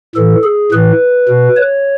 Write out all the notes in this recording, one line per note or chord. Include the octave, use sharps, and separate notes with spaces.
A2 E3 A4
G#4
A2 E3 B4
B2
C#5